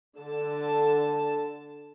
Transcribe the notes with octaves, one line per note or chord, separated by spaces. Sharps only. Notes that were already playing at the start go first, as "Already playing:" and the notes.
D3 A5